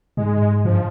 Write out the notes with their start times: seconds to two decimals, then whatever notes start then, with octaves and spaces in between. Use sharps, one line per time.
0.17 G#2 G#3
0.65 G2 F3